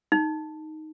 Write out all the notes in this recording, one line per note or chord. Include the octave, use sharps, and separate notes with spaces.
D#4